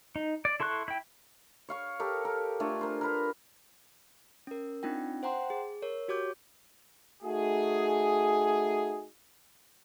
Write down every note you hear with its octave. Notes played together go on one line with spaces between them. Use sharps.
D#4
D5
E4 A4 C6 C#6 F#6
E4 G5
C#5 F5 C#6
G4 A4 A#4 C#5
A#4
A3 D4 F4 G#5
A#4 C5
A#4 B4 A#5
C#4 A#4
C4 D4 D#4 F4 G5
C5 F#5 G5 A#5 C6
G#4
A#4 C#5
F#4 G4 C#5 D6 G6
A3 D#4 F#4 G#4